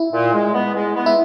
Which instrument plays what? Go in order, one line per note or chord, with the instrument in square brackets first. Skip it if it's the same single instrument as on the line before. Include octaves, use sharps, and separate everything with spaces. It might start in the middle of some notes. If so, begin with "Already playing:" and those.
Already playing: [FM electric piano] E4
[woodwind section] A#2
G#3
B3
G#3
B3
[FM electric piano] E4